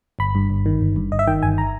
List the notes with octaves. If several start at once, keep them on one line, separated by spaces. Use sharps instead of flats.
G1 B5
G2
G1
D#3
G1
G2
G1 D#5
E5
D#3 G5
G1 G#5
A#5